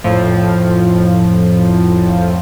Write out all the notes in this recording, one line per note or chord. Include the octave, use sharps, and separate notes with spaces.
F2 A2 F3